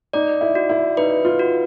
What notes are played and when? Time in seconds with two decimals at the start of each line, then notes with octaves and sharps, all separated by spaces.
0.13 D#4 D5
0.41 E4
0.55 F#4
0.69 E4
0.97 D#4 B4
1.25 F4
1.39 F#4